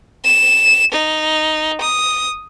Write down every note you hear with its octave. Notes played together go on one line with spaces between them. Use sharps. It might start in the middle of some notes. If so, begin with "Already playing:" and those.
E7
D#4
D#6